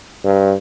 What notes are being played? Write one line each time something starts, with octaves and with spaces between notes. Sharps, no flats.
G2